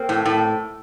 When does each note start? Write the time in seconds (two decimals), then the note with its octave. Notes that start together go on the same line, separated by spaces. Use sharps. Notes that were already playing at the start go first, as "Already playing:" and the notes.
Already playing: A#3 C4
0.09 A2
0.25 A2